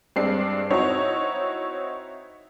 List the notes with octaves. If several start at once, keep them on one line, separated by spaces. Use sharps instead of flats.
G2 G#3 C4 D4 C7
C4 D#4 E4 F#4 C#5